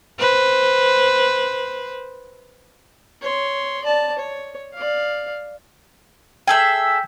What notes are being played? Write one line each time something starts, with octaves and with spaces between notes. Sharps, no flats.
B4 C5
C#5 C6
D5 A5
C#5
D5 F5
G#4 A4 E5 G5 G6